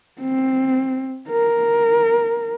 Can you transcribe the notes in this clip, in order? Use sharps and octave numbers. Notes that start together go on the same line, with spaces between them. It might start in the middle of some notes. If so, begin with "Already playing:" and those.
C4
A#4